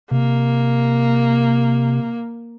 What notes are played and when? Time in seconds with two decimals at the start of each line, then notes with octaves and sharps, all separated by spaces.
0.11 C3 A#3